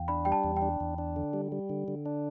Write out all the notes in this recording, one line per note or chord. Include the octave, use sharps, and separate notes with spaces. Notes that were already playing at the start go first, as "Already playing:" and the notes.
Already playing: E2 F5 G5
D4 B5
G3 G5
A5
E2
G5
D4
E2
D4
D3
G3
G3
D3
D3
D4